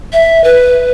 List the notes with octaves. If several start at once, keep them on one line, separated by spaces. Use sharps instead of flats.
E5
B4